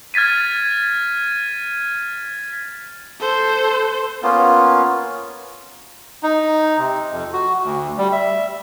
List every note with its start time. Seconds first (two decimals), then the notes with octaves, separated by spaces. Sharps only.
0.14 F6 G#6 A6 B6 D#7
3.20 A4 C5
4.23 A#3 B3 C#4 F4
6.23 D#4
6.78 C3
7.12 F2
7.33 F#4
7.64 D2
7.98 G3
8.12 E5